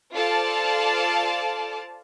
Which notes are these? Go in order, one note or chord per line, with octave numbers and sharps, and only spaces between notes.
F4 A4 C5 D5 F5 A5